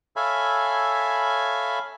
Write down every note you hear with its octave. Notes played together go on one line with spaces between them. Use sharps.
A4 C#5 E5 F5 G#5 B5